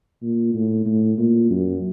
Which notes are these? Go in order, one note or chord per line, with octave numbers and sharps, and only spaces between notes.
A#2
A2
A2
A#2
F#2